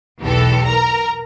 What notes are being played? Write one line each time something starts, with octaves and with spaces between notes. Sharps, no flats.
B1 E2 G4 A4
A#4 A#5